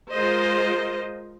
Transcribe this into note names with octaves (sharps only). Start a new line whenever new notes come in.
G#3 F4 A#4 C5 D#5